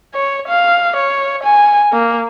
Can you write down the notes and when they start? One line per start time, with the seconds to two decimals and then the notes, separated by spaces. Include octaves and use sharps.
0.14 C#5
0.48 F5
0.96 C#5
1.43 G#5
1.92 A#3